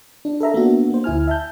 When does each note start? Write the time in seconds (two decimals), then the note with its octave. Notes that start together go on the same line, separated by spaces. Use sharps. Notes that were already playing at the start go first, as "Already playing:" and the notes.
0.25 D4
0.40 A4 A#4 E5 A#5
0.54 A#3 B3 D4 F#4
0.90 A#3 C5
1.04 D2 E4 G#5 F6
1.27 E5 A5 G6